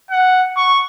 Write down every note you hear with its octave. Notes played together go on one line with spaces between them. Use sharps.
F#5
C#6